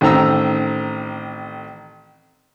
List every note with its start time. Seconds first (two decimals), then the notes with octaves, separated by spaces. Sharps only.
0.01 A1 D#3 C4 A#5 E6